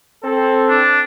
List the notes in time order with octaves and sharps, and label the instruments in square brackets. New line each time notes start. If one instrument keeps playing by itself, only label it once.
[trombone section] C4 A4
[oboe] D4